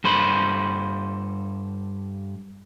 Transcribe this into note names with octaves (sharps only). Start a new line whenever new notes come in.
G2 A4 C5 B5